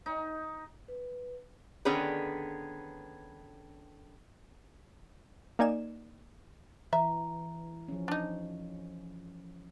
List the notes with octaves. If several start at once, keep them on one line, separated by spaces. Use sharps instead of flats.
D#4
B4
D3 D#3 B3 C#4 G#4 B4
A#3 D#4 D5 G#5 E7
E3 E5 A#5
F3 C#4
D4 D#4